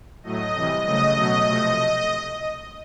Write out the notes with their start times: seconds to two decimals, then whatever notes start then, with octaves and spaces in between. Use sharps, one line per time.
0.23 A2 F#3 A3 D#5
0.55 C3 E3 G3
0.84 C#3 F#3 A3 D#5
1.15 B2 F#3 A3 D#5
1.45 C3 F3 A3